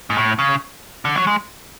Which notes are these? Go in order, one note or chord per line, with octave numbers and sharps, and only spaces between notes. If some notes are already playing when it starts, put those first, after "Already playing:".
G#2
A2
C#3
D3
F#3
G#3